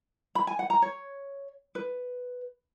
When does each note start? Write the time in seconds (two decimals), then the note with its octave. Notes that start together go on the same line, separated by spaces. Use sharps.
0.35 B5
0.47 G#5
0.59 F#5
0.70 A#5
0.82 C#5
1.75 B4